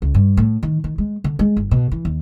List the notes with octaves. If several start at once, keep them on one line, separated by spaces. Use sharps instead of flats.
C#2
G2
A2
D#3
D#3
G#3
D3
G#3
G1
B2
E3
D#2